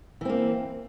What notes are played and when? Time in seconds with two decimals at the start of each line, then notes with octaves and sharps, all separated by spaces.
0.21 E3
0.25 C4
0.30 A#3